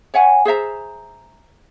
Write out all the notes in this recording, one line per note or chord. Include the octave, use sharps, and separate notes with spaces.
C#5 E5 F#5 G#5
G#4 C5 E5 A#5